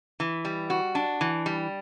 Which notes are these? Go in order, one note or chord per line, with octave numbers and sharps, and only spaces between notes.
E3
G3
F#4
D4
E3
G3